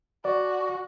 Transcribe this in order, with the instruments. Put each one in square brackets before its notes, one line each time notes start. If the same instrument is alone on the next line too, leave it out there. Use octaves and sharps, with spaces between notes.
[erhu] F#4 [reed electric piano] D5